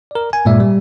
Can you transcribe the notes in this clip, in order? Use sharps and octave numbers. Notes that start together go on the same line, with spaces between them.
A#4 D5
G#5
G2 A#2 G#3 D5 E5
G3